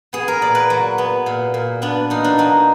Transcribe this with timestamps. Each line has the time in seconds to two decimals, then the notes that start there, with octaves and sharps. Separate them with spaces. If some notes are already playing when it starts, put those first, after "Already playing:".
0.13 B3 G#4
0.28 A#4
0.41 A#2 D5
0.55 B4
0.70 F#3
0.98 B3
1.26 A#2
1.54 A#2
1.82 B3 D4
2.10 A#2 D#4
2.24 D4
2.38 F#3 D#4